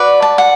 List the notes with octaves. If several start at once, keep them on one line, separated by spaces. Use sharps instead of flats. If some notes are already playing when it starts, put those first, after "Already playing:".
Already playing: F#4 B4 D5
A5
F#5